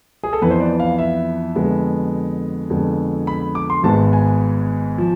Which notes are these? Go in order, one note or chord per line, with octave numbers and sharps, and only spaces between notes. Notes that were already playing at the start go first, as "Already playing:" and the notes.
G#4
A4
F2 E3 B3 B4
C5
D5
F5
E5
F2 D3 G#3 B3
F2 D3 G#3 B3
B5
D6
C6
G#1 G#2 G#3 B3 A5
G#5
F3